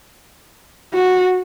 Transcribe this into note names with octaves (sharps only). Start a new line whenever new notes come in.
F#4